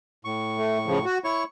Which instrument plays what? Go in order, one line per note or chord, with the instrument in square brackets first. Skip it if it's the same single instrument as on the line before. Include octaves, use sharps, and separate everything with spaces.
[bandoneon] A2 C#6
[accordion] A3
C#3 F3
F#4
[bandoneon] E4 C#5 [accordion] C#6